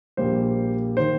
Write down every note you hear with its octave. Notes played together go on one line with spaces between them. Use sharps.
A#1 A#2 G3 A#3 C5
D#3 A#3 C5